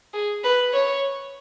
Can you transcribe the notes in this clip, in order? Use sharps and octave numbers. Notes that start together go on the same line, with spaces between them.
G#4
B4
C#5